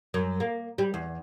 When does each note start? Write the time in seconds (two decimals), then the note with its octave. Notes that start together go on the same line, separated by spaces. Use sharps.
0.14 F#2
0.40 A#3
0.78 G3
0.94 E2